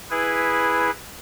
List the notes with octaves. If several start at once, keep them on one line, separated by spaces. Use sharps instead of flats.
E4 G#4 B4